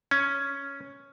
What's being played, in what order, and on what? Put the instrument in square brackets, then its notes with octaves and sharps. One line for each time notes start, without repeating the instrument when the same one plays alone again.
[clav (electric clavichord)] C#4